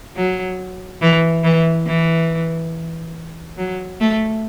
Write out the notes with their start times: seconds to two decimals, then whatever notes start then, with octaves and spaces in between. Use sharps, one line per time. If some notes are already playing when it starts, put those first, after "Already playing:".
0.17 F#3
1.02 E3
1.44 E3
1.87 E3
3.58 F#3
4.00 A3